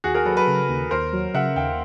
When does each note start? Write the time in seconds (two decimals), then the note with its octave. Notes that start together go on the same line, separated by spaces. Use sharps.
0.04 D#2 F#4 G#4
0.14 G#4 A#4
0.25 F#3 A4 B4
0.37 A4 B4
0.47 C#3
0.69 D#2
0.91 D#2 A#4 C5
1.13 F#3
1.34 C#3 E5 F#5
1.56 D#2 F5 G5